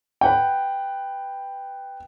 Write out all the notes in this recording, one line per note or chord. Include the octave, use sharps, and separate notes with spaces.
B4 F#5 G5